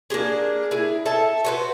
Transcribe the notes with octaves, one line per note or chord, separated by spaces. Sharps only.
A#3 D4 G4 G#4
E4 G#4
A4 E5 G#5 A5
F#4 B4 C5